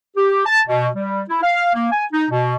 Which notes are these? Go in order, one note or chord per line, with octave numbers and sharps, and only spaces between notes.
G4
A5
B2
G3
E4
F5
A#3
G#5
D#4
B2